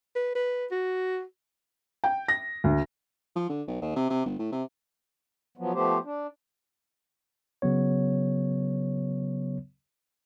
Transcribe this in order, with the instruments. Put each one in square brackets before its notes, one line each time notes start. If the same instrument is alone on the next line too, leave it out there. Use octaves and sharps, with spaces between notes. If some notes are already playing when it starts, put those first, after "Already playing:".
[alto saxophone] B4
B4
F#4
[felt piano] G5
A#6
D2
[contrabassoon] F3
D3
B1
D#2
C3
C3
G1
A2
C3
[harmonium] F3 F#3 B3
F3 A3 B3 G4 C5
D4
[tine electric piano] C#3 F#3 B3 C#5